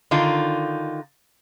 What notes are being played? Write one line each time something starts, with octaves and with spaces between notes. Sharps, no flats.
D3 D#3 D#4 F4